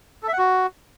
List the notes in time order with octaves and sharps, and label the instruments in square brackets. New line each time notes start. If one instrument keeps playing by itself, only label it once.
[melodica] A4
E5
F#5
F#4